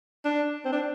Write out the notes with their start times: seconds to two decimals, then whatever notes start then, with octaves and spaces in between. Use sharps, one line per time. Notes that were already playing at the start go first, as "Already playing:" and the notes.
0.24 D4
0.65 C4
0.72 D4